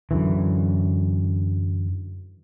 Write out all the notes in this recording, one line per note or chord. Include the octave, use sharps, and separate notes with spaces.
F#2 D3 E3